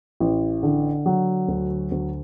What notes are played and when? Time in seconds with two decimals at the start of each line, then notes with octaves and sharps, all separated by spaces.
0.20 A1
0.63 D3
1.06 F#3
1.48 D2
1.91 D2